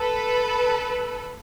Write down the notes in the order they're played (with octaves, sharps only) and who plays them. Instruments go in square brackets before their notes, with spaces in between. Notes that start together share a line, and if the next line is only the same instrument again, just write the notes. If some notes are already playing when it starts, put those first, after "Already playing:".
Already playing: [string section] A4 B4